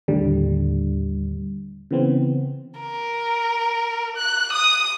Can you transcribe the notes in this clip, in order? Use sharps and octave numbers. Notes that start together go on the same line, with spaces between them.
D#2 A2 D3 G3
C#3 E3 B3 C4
A#4
F#6
D#6